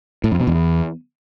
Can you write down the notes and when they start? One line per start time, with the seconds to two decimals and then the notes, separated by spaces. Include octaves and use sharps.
0.24 A2
0.32 F2
0.40 B2
0.47 E2